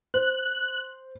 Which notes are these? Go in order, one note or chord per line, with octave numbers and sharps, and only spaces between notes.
C5 F#6